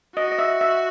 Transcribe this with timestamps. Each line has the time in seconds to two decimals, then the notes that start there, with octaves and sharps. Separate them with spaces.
0.16 F#4 D#5
0.32 D#5
0.39 E5
0.61 E5